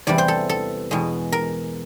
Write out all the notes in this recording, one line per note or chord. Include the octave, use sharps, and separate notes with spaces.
E2 C3 E3 G3 D5
C5
A4
A4
E2 B2 G#3
A#4